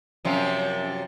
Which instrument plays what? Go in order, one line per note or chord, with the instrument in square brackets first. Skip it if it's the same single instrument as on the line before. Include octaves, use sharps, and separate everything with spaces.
[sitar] F#2 C3 F3